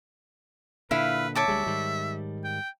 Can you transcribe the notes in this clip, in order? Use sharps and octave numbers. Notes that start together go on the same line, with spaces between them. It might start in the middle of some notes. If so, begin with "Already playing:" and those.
A#2 D3 E4 B4 F5
C#5 E5 A5 D6
D2 G3 G#3
G#2 D#3 G3
G5